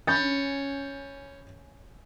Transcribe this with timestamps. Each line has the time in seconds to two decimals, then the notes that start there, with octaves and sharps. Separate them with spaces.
0.07 C#4 B5 G6 A6